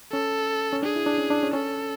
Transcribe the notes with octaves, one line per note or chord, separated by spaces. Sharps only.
C#4 A4
C#4
D4 G#4
E4
D4
C#4
D4
C#4
C#4 A4